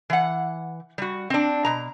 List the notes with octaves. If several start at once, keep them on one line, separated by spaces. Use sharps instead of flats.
E3 F#5
G3 F#4
C4 D4
B2 A#5